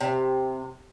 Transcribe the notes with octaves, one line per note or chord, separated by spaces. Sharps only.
C3